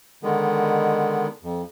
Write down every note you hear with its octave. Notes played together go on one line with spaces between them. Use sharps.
D3 D#3 G#3 B3
F2